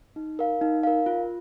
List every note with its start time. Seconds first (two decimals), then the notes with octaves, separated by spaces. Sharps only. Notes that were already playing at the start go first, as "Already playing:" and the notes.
0.16 D#4
0.39 A#4 F5
0.61 D#4
0.83 A#4 F5
1.06 F4